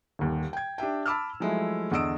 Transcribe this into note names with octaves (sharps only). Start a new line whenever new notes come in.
D#1 D#2
G5 G#6
D4 G4 E5 G5
A5 B5 D6 E6 F6
F3 F#3 G#3 A3 E4
E2 D3 D#5 D#6 E6 D7